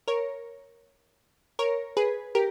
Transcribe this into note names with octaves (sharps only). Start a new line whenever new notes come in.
A#4 C#5
A#4 C#5
G#4 B4
G4 A#4